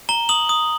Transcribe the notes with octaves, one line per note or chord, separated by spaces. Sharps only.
A#5 G7
D#6 F#7
D#6